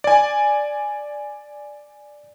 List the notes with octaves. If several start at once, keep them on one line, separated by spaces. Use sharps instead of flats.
D5 G#5